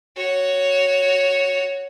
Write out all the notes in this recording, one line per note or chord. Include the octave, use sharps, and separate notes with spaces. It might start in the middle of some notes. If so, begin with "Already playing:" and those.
F#4 C#5